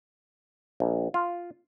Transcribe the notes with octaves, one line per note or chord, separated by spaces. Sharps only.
A#1
F4